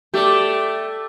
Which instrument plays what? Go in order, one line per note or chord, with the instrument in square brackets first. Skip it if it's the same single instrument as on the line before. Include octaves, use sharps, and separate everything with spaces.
[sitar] A3 [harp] G4 D5